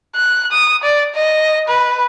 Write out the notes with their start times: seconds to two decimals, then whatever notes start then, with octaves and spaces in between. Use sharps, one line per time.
0.15 F#6
0.52 D#6
0.84 D5
1.15 D#5
1.68 B4